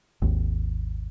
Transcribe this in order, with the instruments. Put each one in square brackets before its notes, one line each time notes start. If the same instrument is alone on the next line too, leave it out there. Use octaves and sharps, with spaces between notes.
[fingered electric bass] G#1 D#2